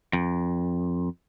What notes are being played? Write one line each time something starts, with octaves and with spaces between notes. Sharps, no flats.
F2